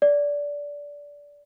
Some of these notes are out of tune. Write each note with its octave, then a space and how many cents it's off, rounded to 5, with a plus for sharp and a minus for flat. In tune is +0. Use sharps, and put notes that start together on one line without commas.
D5 -15